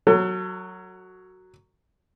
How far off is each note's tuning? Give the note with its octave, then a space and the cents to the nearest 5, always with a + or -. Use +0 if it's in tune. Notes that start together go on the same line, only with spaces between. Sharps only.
F#3 +0 A4 +40